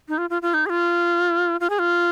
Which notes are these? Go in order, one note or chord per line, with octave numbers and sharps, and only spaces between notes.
D#4
F4
F4
F4
D#4
G#4
F4
F4
G#4
F4